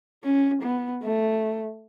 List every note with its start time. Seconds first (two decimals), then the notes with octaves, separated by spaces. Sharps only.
0.24 C#4
0.62 B3
1.03 A3